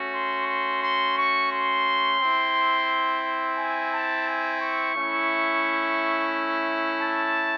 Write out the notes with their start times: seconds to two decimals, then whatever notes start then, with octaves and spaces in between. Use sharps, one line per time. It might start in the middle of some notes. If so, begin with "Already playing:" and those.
Already playing: A3 C#4 F#4
0.14 C6
0.48 C6
0.83 C6
1.18 C#6
1.52 C6
2.20 C4 E4
3.57 G#5
3.93 A5
4.27 G#5
4.62 C#6
4.95 A3 C#4 E4
7.01 A5